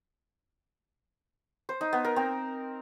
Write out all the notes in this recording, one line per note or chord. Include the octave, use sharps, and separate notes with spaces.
C5
D#4
B3
A#4
C4